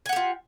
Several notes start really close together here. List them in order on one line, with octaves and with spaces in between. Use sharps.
G#5 F#5 G4 F4